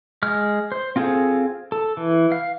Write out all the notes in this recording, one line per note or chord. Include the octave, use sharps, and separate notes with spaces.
G#3 F6
C5
C4 F4 G#4 A4
A4
E3
F5